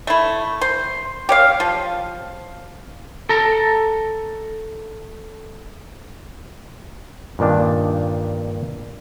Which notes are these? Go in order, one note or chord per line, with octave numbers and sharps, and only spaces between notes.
A3 E4
C5
G4 C#5 F5
F3
A4 A#5
G2 A#2 D#3 D4